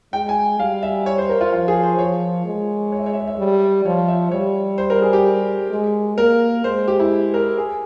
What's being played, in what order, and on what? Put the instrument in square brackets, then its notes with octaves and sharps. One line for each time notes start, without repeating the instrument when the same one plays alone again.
[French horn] G#3 [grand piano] G5
[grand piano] G#5
[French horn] G3 [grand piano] F5
[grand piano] E5
C#5
C5
A#4
F4
[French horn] F3 [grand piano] F4
[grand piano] G#4
C5
[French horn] F3 [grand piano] C#5
[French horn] G#3
[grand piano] C#5
E5
C#5
E5
C#5
E5
[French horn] G3 [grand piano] C#5
[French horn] F3 [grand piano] C#5
[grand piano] E5
[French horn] G3 [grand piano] C#5
[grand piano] C5
A#4
G#4
G4
[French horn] G#3
[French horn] A#3 [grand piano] A#4
[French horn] G#3 [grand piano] C5
[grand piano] G4
E4
A#4
G#4